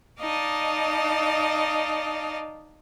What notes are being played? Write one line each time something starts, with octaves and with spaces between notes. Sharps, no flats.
D#4 D5 D#5 F5 A5